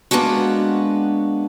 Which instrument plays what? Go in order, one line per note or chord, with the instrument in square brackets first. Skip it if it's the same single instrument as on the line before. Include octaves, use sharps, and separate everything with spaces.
[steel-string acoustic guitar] G#3 A#3 B3 D4 F#4